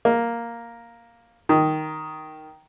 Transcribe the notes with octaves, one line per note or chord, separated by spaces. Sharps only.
A#3
D#3